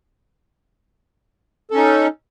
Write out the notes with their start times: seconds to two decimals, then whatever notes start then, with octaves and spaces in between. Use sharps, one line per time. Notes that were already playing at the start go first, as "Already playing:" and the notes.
1.71 A4
1.73 C#4
1.76 D#4